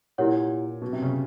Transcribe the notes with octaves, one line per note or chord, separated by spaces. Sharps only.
A#2 E4 G4 A#4 C#5 F#5
B2
C3
C#3